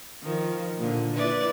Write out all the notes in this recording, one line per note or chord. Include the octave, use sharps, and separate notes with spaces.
D#3 F3
A#2 D3
E4 B4 D5